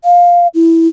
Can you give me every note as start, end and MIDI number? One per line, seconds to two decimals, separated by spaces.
0.04 0.47 77
0.54 0.88 64